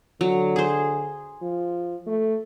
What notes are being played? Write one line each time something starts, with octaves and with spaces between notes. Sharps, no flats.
D3 F#3
G#4 C5
F3
A3